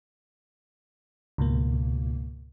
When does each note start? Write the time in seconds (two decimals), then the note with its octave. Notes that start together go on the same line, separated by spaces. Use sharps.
1.38 C#2 G#2 B2 A#3